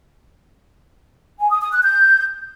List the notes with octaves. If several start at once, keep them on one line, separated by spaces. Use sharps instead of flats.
G#5
D#6
D#6
F#6
G6